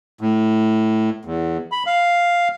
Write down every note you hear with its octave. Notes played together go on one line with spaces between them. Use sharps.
A2
E2
B5
F5